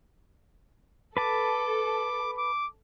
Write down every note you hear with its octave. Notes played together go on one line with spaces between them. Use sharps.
A4 B4 A5 D6
D6